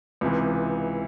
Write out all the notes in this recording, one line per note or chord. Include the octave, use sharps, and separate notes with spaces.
C#2 C3 E3